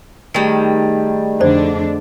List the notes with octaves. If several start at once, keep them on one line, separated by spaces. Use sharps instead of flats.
D#3 G3 A3 G#4 D#5
F2 D3 D4 C5 D5